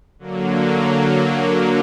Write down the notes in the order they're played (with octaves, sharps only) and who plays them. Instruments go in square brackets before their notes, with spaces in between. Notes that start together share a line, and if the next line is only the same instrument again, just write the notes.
[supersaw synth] D3 F#3 A#3